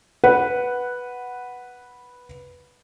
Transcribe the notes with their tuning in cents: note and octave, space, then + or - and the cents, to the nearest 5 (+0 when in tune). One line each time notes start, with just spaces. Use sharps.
B4 -5 F#5 +0